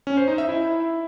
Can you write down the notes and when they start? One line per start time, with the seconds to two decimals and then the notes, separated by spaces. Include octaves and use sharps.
0.07 C#4
0.17 C5
0.28 D#4
0.38 E5
0.49 E4